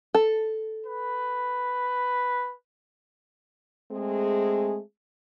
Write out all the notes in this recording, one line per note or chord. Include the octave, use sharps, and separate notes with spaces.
A4
B4
G#3 A3 C4 G#4